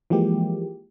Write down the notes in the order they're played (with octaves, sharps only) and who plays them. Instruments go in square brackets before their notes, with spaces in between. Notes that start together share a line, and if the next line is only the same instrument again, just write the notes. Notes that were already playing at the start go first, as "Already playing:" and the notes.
[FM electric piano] E3 F3 G#3 A#3 G4